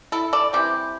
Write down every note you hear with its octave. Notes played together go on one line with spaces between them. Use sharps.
E4 A4
A4 D5
C3 E3 G3 C4 G4